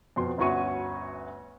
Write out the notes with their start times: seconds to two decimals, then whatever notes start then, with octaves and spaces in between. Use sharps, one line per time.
0.16 F2 B2 C6
0.38 G1 D2 C#4 F#4 C#6 D#7